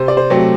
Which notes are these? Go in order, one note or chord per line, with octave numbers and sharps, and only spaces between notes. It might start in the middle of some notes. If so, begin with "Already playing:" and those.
Already playing: C3 C5
D5
C5
F#3 A3 C4